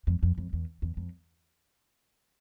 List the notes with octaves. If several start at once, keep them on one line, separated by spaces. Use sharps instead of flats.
F2
F2
F2
E2
E2
F2